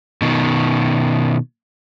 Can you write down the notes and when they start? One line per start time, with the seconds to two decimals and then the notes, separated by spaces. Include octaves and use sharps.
0.22 B2 D#3